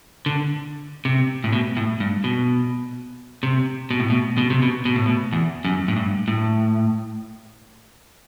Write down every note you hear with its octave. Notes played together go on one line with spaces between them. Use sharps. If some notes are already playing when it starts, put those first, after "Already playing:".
D3
C3
A2
B2
A2
G2
B2
C3
B2
A2
B2
B2
C3
B2
B2
A2
B2
E2
F#2
A2
G2
A2